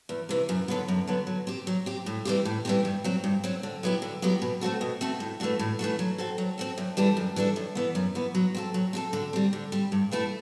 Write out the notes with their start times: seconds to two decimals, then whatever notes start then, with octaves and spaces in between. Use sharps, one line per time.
0.09 E2
0.29 C3 E3
0.49 F#2
0.68 D3 F#3 B3
0.88 F#2
1.07 D3 F#3 B3
1.27 F#3
1.47 C4 G4
1.67 F#3
1.86 C4 G4
2.06 A2
2.25 E3 G3 C4 G4
2.45 A2
2.65 E3 G3 C4 G4
2.85 G2
3.04 F#3 C4
3.24 G2
3.44 F#3 C4
3.63 D3
3.83 F#3 B3 E4 G4
4.02 D3
4.22 F#3 B3 E4 G4
4.42 B2
4.61 A3 C4 F#4 A4
4.81 B2
5.01 A3 C4 F#4 A4
5.20 A2
5.40 E3 A3 D4 F#4
5.59 A2
5.79 E3 A3 D4 F#4
5.99 F#3
6.18 C4 F#4 A4
6.38 F#3
6.58 C4 F#4 A4
6.78 F#2
6.97 E3 G3 D4 A4
7.17 F#2
7.36 E3 G3 D4 A4
7.56 F#2
7.75 E3 B3
7.95 F#2
8.15 E3 B3
8.35 F#3
8.55 C4 F#4 A4
8.74 F#3
8.93 C4 F#4 A4
9.13 D3
9.33 G3 C4
9.53 D3
9.72 G3 C4
9.92 G2
10.11 E3 A3 E4 A4